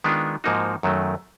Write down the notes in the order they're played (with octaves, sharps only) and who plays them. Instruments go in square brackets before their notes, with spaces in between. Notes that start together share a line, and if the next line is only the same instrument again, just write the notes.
[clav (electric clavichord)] D#3 G#3 B3 D4 F4
G#2 F3 A#3 D#4 F#4
F#2 D#3 F#3 A3